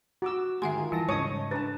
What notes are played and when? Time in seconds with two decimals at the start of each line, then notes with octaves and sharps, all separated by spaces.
0.22 F#4 D6 E6
0.62 G#2 D#3 G#3 E5 F#5 G#5 C6
0.75 D#3 F4
0.92 E3 G3 A5 A#6
1.09 G#2 C#3 C#5 D#5 C#6 D#6 C#7
1.51 D4 B4 A5